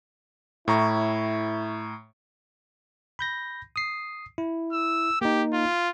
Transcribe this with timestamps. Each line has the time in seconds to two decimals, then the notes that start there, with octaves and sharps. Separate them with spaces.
0.68 A2 E4 A#5 C#6
3.19 B5 G6 A#6
3.76 D#6 C7
4.38 E4
4.72 E6
5.22 A#3 D#4 G4
5.53 F4